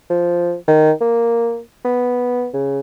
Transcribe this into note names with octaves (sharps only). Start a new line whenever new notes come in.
F3
D#3
A#3
B3
C#3